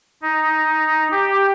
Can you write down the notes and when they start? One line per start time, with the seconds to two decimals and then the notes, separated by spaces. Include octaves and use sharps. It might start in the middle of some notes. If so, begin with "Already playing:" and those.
0.22 D#4
1.12 G4